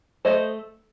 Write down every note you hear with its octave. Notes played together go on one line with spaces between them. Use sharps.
A3 C5 D#5